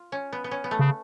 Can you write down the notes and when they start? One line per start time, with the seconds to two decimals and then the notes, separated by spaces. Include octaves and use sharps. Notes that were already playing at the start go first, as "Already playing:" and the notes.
Already playing: F4
0.12 C#4
0.33 B3
0.44 B3
0.51 C#4
0.64 B3
0.71 A3
0.79 C#3